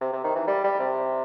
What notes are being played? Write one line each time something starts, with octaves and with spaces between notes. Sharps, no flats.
C3
C3
D#3
E3
G3
G3
C3